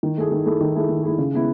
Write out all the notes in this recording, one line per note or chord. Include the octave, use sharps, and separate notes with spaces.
D#3
A3 E4 G#4
D#3
A3 E4 G#4
D#3
A3 E4 G#4
D#3
A3 E4 G#4
C#3
G#3 B3 E4